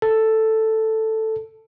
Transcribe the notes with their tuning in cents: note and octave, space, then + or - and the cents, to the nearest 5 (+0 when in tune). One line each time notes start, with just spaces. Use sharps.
A4 +5